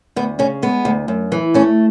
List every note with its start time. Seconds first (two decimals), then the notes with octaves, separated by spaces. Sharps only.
0.16 D2 B3
0.39 C#3 C#4
0.62 G#3 B3
0.85 D2
1.08 F#2
1.32 E3
1.54 A3 C#4